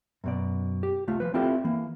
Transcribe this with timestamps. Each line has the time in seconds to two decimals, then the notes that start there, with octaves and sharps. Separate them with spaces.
0.24 F#2 B2 D5
0.83 G4
1.07 C2 A3 F4
1.20 F3 B4
1.34 C4 E4 F4 G4 A4 D5
1.64 E3 A#3